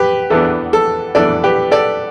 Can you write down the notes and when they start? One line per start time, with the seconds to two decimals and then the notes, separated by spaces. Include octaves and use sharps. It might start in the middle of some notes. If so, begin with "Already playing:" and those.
Already playing: G4 B4
0.30 E2 E3 B3 D4 A4
0.73 A4
1.15 E2 E3 B3 D4 A4 D5
1.44 G4 B4
1.71 A4 D5